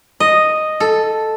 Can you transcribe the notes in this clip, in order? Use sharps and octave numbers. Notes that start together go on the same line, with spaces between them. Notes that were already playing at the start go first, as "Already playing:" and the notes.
D#5
A4